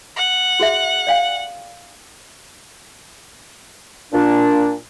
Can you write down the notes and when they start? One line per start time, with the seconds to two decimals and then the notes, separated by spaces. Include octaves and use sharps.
0.16 F#5
0.60 F#4 G#4 E5
1.07 D5 F5 G5
4.13 A#2 D4